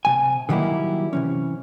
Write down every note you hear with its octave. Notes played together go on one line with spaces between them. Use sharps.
C3 F#3 G#5
D3 D#3 F#3 G3 A#3 E4
C3 E3 C#4